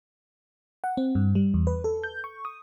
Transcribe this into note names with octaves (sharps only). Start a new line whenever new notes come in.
F#5
C4
G2
G3
E2
B4
A4
G6
C#6
D#6